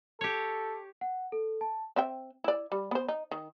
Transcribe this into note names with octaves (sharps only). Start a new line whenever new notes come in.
G4 A4 C#5
F#5
A4
A5
C4 E5 G5
E4 D5
G3
B3 C5
D#4
D#3